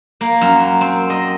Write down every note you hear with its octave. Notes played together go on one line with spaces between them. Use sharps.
A#3
F#2
C4
D#5